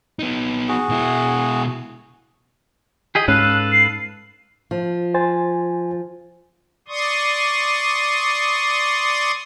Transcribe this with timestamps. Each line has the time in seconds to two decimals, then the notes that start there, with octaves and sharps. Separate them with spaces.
0.19 B3 D#4
0.68 F#4 G#4
0.89 B2 E4
3.15 G4 G#4 D#5
3.28 G#2 C#4 A4 B4 F5 F#6
3.72 C7
4.71 F3
5.14 C5 G#5 A6
6.88 D5 C6 C#6 D#6